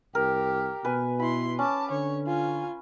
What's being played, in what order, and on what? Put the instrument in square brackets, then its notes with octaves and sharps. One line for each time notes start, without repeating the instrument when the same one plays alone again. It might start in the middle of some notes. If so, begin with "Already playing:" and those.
[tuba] C2 [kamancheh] G4 [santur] A#4
[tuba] B2 [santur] B4 G#5
[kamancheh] E4 C6 [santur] B5
[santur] C#4 [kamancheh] A5 D6
[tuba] D3 [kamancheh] C#5
[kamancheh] F4 G#5